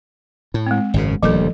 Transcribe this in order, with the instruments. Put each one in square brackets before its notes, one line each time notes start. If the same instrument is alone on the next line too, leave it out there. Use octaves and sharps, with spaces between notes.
[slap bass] A2
[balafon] G#3 C4
[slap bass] G#1 F#2 C#3
[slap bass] D#1 D2 G3 [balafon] F3 A4